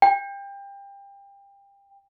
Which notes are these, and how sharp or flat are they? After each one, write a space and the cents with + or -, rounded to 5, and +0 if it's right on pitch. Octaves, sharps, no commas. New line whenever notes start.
G5 +25